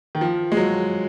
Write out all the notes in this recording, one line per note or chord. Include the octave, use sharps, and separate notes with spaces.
D#3
F3
G#3
F#3